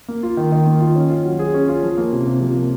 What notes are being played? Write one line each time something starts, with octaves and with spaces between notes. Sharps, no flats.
A#3
F4
D#3
D#3
A#3
F4
C#4
F4
F#3
G#4
C#4
F4
F3
A#3
C3
C3
F3
A#3